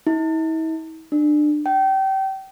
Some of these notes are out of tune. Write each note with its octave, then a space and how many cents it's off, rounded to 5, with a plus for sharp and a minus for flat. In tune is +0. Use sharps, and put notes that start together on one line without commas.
E4 -45
D4 +25
G5 -30